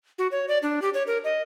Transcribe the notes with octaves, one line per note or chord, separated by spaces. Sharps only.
F#4
C#5
D5
D4
G4
C#5
A#4
D#5